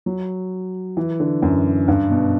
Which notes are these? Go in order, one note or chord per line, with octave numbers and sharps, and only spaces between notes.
F#3
E3
D3
F#2
G2
B2